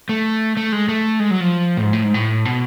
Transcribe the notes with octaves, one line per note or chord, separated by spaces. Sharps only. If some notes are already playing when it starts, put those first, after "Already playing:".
A3
A3
G#3
A3
G#3
F#3
F3
A2
G#2
A2
G#2
A2
B2